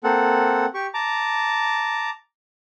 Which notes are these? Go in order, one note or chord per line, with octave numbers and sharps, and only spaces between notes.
A#3 C4 A4 F#5
G4 C#6
A5 A#5 D6